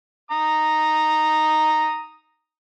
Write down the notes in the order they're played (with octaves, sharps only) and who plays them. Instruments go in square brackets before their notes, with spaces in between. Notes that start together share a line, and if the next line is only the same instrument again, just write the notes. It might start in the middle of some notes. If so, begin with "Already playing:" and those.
[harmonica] A#5 D#6